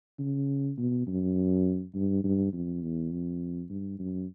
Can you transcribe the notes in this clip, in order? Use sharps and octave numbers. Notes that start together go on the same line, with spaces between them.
C#3
B2
F#2
G2
G2
F2
E2
F2
G2
F#2